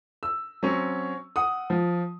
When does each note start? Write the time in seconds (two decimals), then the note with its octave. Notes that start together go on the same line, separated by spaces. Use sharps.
0.23 E6
0.63 F#3 C4 C#4
1.36 F#5 D#6
1.70 F3